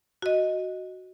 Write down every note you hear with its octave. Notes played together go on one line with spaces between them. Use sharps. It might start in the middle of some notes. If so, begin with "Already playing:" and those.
F#4 D#5